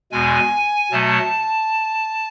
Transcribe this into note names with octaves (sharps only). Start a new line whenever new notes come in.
E2 B2 G#3 G#5
B2 F#3 A3 A5